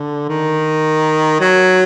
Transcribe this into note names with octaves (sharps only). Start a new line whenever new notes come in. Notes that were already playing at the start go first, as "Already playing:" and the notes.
Already playing: D3
D#3
F#3